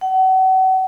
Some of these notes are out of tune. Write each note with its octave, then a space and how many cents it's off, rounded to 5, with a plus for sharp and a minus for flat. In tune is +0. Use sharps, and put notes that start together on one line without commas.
F#5 +35